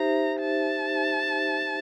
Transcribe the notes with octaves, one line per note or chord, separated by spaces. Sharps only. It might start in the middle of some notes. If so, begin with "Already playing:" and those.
Already playing: D#4 G4 C5 E5 A#5
A5